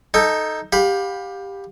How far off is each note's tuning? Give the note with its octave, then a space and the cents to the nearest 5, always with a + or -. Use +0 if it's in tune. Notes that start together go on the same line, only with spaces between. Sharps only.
D#4 +0 A4 +0 G5 +25
G4 +10 F5 +30 B5 +0